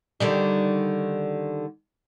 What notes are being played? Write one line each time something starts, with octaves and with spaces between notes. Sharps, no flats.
D3 D#3 G3